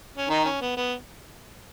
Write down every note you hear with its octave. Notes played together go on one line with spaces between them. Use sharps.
C#4
D#3 D#4
C#4
B3
B3